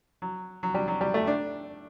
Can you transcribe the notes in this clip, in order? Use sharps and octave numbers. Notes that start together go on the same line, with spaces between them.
F#3
F#3
G3
F#3
G3
A3
D4